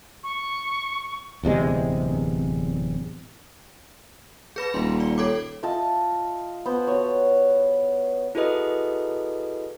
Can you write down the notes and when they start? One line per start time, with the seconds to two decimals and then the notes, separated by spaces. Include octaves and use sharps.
0.23 C#6
1.43 D1 E2 C3 G#3
4.56 G#4 B4 B5
4.74 D#1 C6
5.00 D5
5.18 A4 C#5 D6
5.63 F4 D#5 E5 A5
6.66 B3 C5
6.87 F#4 C#5
8.35 E4 F#4 G#4 A4 B4 D#5